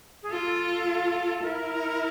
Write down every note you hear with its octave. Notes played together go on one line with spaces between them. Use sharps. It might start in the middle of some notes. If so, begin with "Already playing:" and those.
G#4
F4 A4
E4 A#4